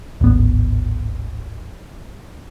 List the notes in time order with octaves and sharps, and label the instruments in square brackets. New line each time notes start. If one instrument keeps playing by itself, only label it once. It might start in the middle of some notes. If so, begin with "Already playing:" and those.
[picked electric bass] D1 G#1 B3